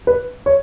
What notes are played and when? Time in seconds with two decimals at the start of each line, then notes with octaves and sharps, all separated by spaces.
0.07 B4
0.46 C#5